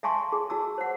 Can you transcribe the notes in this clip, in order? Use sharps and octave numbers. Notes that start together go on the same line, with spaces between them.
E5 F5 G#5 A5 C6 C#6
G#4
F#4 A5 E6
C5 F#5